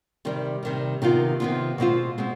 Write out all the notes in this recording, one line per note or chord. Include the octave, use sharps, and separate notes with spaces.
C3 D#3 G3
C3 D#3 G3
C3 D#3 B3 F4
C3 D#3 B3 F4
B2 G#3 C4 F4
B2 G#3 C4